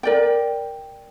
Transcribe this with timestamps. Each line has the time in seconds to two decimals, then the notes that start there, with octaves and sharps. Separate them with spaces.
0.03 A#4 D5 G5